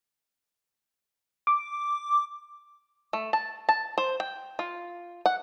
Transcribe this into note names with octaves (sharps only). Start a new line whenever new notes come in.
D6
A3
A5
A5
C5
G5
F4
F#5